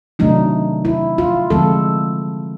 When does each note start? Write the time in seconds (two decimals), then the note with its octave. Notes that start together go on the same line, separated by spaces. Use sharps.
0.19 C3 D#3 F#3 A3 D4 D#4
0.85 E4
1.18 F4
1.50 D3 F3 G#3 C4 A4